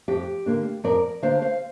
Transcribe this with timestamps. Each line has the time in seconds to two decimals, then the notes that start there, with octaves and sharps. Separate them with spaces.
0.08 F2 G4
0.46 D3 A#3 D4
0.84 F2 A#4 D5
1.22 D3 A#3 D4 C5 F5
1.42 C5 F5